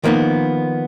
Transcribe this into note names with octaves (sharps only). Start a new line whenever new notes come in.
D#3 F3 A#3 B3 D#4